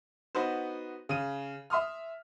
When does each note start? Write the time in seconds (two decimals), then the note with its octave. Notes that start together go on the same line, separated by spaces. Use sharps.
0.35 B3 D#4 F#4 B4 C5
1.09 C#3 D#7
1.70 E5 C6 D#6 F6